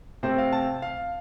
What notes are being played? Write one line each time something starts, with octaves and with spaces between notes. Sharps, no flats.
C3 A3 C4 C5
F5
A5
F5